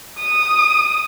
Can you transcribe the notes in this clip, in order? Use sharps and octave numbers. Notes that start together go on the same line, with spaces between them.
D#6